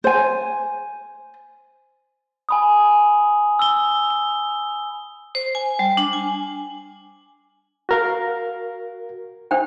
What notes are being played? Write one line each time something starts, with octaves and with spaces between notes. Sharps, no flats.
C5 G#5
G#5 B5 D#6
E6 G7
G7
C5
G#5
G3
D4
G#5
F#4 A#4 F5
D4 C5 G5